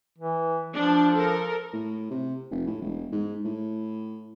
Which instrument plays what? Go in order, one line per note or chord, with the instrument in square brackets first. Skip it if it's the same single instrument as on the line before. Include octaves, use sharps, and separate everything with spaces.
[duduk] E3
[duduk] F3 [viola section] D4
[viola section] A4 A#4
[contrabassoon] A2
C3
F1
A2
E1
G#2
A2